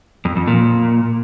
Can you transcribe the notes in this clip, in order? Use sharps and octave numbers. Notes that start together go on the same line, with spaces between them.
F2
F2
A#2